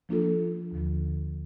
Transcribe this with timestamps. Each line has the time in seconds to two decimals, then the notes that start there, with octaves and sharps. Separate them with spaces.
0.09 F3 A#3 D4 F4 A4
0.72 D#2 D3 F3